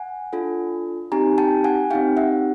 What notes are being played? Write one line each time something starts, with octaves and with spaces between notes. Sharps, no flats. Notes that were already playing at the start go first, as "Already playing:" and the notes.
Already playing: F#5 G#5
D4 F4 A4
C4 D#4 G4 G#5 A#5
G5 A5
F#5 G#5
C4 D#4 G4 F5 G5
E5 F#5